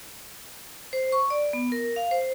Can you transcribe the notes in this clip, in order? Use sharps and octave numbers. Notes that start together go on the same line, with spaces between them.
C5
C#6
D5
B3
A#4
F5
C5